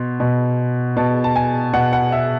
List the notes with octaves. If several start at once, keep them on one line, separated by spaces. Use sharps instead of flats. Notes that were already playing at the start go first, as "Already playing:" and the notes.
Already playing: B2 C6
B2
B2 A5
A5
G#5
B2 F#5
F#5
E5